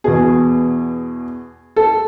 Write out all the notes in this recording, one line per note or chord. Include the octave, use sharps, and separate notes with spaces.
E2 B2 G#4
A4